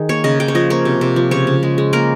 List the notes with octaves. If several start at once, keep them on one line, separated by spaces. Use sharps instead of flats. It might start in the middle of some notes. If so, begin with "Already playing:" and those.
Already playing: D#3 G#4
A#3 C#5
C#3 D#5
C#3 G5
C#5
F3 D#5
A#3 C#5
C3
C3
F3
C#3 C#5
C#3
G#3
G#3
A#3 A#4